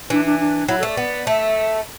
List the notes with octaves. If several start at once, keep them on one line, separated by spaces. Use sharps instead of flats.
E3 D4
D4
D4
F#3 E4
A4
A3 D5
B3
A3 E5